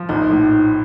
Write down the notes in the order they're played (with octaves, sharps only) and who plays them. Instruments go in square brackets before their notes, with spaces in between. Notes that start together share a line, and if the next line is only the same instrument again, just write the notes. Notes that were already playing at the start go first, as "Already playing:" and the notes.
Already playing: [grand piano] F3
[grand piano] A#1 [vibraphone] D#4
[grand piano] A2